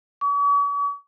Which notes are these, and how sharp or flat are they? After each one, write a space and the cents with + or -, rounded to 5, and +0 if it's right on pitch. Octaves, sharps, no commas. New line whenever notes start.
C#6 +45